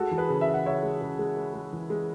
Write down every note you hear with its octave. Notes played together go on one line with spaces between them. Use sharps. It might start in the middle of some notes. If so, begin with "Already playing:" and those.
Already playing: G#3 F#4 A4
E3
G#4 B4
C#3
E5
C#3
F#5
C#3 C#5 E5
G#3
C#3
G#3
G#3
G#3
E3
G#3